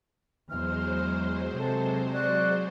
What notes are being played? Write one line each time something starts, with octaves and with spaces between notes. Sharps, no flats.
E2 F#3 G#3 C5 F6
C3 A4
F#4 D5 F#6